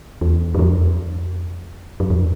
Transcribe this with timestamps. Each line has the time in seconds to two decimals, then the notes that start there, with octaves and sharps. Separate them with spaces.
0.21 E2
0.55 F#2
0.59 F2
2.00 F#2
2.10 F2